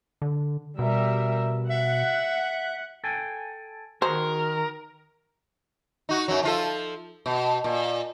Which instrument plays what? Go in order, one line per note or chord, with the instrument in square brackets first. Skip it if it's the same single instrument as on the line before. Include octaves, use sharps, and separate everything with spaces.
[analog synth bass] D3
[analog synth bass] B2 [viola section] G3 A#4 E5
[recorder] E5 [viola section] F#5
[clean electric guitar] A4 G5 G#5
[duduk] D#3 [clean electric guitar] F#4 G#4 [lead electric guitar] A#4 [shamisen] C5
[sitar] D#4 F#4
F#2 F#3
F3 F4 A4
B2
A#2